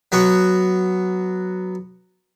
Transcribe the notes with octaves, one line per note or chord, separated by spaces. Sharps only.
F#3 B3 F#4